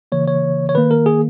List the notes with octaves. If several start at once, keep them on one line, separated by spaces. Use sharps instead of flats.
C#3 E3 A#3 C#5
C#5
C#5
D#3 A#3 B4
A#4
G#4